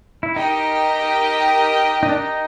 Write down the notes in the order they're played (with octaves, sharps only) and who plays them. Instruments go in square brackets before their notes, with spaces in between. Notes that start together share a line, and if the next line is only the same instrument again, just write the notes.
[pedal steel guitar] E4
[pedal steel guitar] D#4 [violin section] G4 A#4 D#5 G5
[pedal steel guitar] D#4
D4
D#4